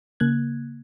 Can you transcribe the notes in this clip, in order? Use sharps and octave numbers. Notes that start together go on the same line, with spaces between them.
C#3 A#3 F#6 G#6